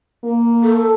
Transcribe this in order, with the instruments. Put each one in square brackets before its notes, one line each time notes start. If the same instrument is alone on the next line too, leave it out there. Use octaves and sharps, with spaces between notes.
[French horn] A#3
[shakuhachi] A4